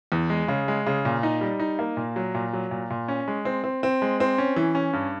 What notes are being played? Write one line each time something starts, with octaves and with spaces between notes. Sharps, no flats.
E2
G#3
C#3
G#3
C#3
A#2
D#4
G3
D#4
A#3
A#2
F#3
A#2
F#3
A#2
A#2
C#4
G#3
C4
C4
C4
G#3
C4
C#4
E3
C#4
G2